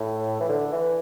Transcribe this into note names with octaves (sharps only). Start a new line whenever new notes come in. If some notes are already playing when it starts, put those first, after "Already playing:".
Already playing: A2
E3
D3
E3